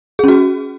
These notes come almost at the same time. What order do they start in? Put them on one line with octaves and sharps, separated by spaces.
G#4 C#4 F#4